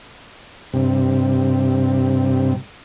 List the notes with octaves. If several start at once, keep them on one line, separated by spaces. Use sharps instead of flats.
G2 C3